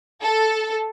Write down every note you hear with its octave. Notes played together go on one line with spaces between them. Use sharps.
A4